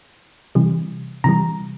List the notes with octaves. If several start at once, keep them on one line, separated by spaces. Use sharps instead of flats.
C3 E3 G3
C3 E3 G3 A#5